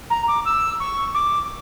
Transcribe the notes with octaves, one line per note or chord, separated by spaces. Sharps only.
A#5
D6
E6
C#6
D6